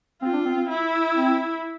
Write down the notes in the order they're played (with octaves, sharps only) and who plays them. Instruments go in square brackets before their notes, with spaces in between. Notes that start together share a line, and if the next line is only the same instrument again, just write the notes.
[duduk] C4 [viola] F4
[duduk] D4
C4
C4
[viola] E4
[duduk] C4